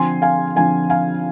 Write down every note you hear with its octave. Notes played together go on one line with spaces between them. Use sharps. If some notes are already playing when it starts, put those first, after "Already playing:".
Already playing: D3 F3 C4 G#5 C6
F5 G#5
D3 F3 C4 F5 G#5
F5 G#5